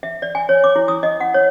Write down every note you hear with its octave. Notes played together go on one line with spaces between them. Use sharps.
E5
D5
G#5
C#5
D6
E4
D#6
D#5
F#5
C#5